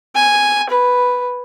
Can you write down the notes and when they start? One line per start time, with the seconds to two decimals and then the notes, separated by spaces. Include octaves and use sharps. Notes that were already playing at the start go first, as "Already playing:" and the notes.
0.15 G#5
0.70 B4